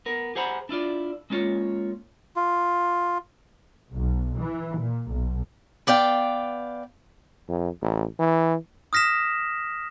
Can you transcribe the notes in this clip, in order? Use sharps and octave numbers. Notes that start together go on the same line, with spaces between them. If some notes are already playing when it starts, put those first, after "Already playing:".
B3 A#4
G4 G#4 C5 F#5 A#5 B5
D4 E4 F4 D5
G#3 A#3 C#4 F4 C#5
F4
B1
E3
A#2
B1
B3 D5 F5 G5
F2
A1
E3
D#6 F6 A#6 B6 E7